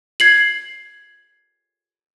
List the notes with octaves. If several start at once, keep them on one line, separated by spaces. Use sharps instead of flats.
G#6 C7 F#7